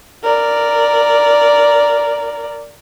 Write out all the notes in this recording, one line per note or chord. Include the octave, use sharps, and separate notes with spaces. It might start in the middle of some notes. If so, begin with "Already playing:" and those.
A#4 D5